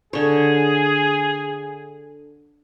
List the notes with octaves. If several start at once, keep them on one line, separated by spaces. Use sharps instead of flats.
D3 G#4 C#5